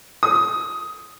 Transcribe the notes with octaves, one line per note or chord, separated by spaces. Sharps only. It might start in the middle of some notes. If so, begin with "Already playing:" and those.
D#6